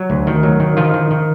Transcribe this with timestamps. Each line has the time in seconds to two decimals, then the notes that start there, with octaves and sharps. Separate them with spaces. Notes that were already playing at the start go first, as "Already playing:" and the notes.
Already playing: F#3
0.10 D2
0.27 D#3
0.43 F#3
0.60 D#3
0.77 D#3 F3 F4
0.94 D#3
1.11 D#3